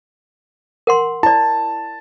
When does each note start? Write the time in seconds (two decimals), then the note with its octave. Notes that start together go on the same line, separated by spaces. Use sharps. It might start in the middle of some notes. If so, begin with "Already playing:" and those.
0.87 A#4 F#5 C6
1.23 E4 D5 A5